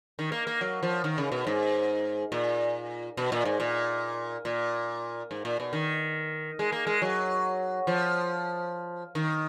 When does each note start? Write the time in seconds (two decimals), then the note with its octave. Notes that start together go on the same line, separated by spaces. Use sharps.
0.19 D#3
0.32 A#3
0.47 A#3
0.61 F#3
0.83 F3
1.04 D#3
1.18 C#3
1.32 B2
1.47 G#2
2.32 A#2
3.17 B2
3.32 A#2
3.45 G#2
3.60 A#2
4.45 A#2
5.31 G#2
5.45 A#2
5.60 B2
5.73 D#3
6.59 G#3
6.72 A#3
6.87 G#3
7.02 F#3
7.87 F3
9.15 D#3